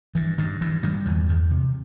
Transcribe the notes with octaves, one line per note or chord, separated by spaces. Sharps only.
G2 E3
G2 D#3
G2 E3
G2 D#3 F#3
E2 E3
E2 D#3
C3